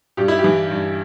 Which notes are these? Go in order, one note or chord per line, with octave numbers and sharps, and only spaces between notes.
G2 G4
E4
G4
E3
G2